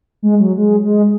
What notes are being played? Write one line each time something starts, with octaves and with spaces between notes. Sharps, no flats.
G#3
F#3
G#3
G#3